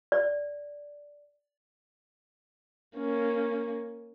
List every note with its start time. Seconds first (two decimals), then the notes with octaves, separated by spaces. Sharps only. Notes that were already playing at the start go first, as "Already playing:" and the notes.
0.12 D5
2.97 A#3 C#4